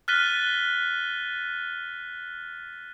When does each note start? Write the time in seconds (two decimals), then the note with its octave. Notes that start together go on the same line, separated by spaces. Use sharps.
0.08 F6 F#6 A6 B6 D#7 G7